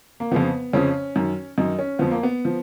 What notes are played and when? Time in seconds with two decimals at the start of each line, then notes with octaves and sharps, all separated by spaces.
0.20 A#3
0.31 F2 C#3 F3 B3
0.73 F2 C#3 F3 C#4
1.16 F#2 D#3
1.58 F#2 D#3 D#4
1.79 C#4
1.99 F2 F3 B3
2.11 A#3
2.23 B3
2.45 F3